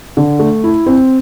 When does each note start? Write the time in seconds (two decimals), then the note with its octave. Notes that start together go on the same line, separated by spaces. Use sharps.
0.17 D3
0.39 A3
0.64 E4
0.86 C4